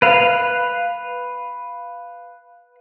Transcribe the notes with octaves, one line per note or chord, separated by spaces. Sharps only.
B4 F5